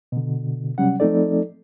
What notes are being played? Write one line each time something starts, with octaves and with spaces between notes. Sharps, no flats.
B2 D3
C3 F#3 G3 C#4 F#5
F3 A3 C4 D#4 A4 D5